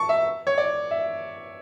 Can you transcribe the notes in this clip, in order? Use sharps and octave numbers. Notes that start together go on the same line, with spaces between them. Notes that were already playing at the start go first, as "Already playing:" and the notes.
Already playing: A5 C#6
E5
C#5
D5
E5